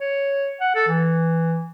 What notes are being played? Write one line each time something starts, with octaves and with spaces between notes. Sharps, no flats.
C#5
F#5
A4
E3